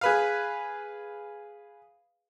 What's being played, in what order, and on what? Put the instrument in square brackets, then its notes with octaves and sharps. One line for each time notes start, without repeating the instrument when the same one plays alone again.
[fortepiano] G#4 B4 F5